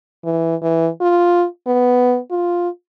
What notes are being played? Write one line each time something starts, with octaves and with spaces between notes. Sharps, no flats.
E3
E3
F4
B3
F4